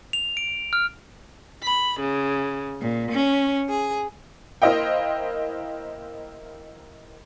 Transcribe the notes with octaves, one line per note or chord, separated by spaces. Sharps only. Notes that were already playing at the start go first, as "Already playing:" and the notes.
F7
D7
F6
B5
C#3
A#2
C#4
G#4
A#3 E4 C5 D#5 F5 G5